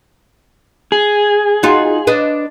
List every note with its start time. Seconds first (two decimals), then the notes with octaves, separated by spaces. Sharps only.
0.92 G#4
1.63 D#4 F4 F#4
2.07 D4 B4 D#5